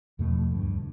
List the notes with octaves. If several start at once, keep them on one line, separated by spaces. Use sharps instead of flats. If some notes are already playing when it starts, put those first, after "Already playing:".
E2 B2 F3 A3
D2 G2